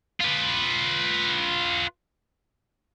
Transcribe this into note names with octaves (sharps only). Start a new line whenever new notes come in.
F4 B4